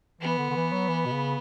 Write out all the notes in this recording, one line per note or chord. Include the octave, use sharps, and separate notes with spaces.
E3 B3
D3
D3
E3
F#3
E3
B2
C#3